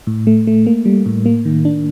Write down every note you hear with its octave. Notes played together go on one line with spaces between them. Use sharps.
A2
A3
A3
A#3
G3
A2
A#3
D#3
D4